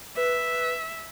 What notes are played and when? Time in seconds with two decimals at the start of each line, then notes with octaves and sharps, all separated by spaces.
0.17 B4 E5